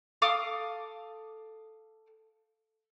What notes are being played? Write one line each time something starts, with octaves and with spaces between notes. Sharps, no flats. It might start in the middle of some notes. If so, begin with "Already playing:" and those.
A4 F5 D6 D#6